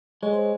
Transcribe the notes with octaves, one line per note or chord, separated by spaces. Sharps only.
G#3 C#5
C5